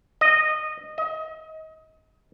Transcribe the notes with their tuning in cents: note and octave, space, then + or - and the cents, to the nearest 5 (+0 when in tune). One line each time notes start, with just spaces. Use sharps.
D#5 -15
D#5 +30